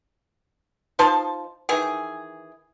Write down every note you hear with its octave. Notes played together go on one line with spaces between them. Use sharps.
F3 D#4 C5 A5
D#3 E3 G#4